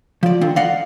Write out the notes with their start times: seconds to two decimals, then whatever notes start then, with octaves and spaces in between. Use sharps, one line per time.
0.23 F3 D5
0.41 D3 D#3 C4
0.56 D5 D#5 F5 F#5